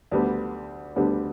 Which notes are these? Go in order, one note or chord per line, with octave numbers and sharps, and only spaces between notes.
D2 D3 G3 B3
D2 D3 G3 B3